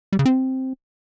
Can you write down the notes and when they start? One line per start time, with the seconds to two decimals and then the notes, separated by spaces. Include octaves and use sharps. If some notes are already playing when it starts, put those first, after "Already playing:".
0.12 G3
0.19 C#3
0.25 C4